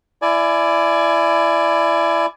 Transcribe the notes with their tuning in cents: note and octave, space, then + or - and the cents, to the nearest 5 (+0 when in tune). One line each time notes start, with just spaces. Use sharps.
E4 +20 D5 +5 G#5 +25